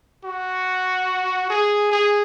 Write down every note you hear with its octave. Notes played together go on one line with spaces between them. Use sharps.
F#4
G#4
G#4